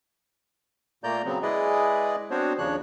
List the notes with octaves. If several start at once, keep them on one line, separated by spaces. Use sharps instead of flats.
A#2 A3 A#3 D5 A#5 G6
C#3 F#3 B3 C4
G#3 E4 G#4 B4 D5 D#5
B3 C4 D4 F#4 C5 C#5
D#2 C#3 F3 D4 C#5 F#6